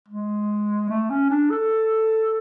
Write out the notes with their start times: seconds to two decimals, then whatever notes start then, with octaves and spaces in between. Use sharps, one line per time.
0.08 G#3
0.89 A3
1.10 C#4
1.30 D4
1.51 A4